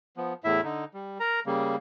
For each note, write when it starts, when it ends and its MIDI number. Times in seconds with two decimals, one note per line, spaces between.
0.17 0.33 53
0.17 0.33 59
0.44 0.61 40
0.44 0.61 45
0.44 0.61 64
0.44 0.61 76
0.64 0.84 50
0.64 0.84 63
0.94 1.18 55
1.20 1.40 70
1.20 1.40 82
1.46 1.76 49
1.46 1.76 55
1.46 1.76 58